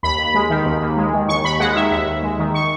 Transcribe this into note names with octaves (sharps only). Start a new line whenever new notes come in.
D#2 B5
D#2
G#3
D#3
D#2
D#2
G#3
D#3
D#2 C#6
D#2 B5
G#3 F#5
D#3 E5
D#2 E5
D#2
G#3
D#3
C#6